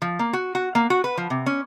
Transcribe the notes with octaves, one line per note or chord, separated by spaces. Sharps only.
F3
A#3
F#4
F#4
A#3
F#4
B4
F3
C3
C#4